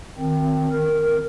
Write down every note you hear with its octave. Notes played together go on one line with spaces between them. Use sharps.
D#3 C4
A#4